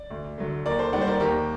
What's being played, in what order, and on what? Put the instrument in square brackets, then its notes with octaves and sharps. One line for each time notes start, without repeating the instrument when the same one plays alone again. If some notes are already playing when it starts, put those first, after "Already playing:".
Already playing: [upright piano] D5
D2
D3 F#3 A3
D#2 A#4 D5
A4 C5
D#3 G3 D5 F#5
C5
A#4 D5
D#2 G4 A#4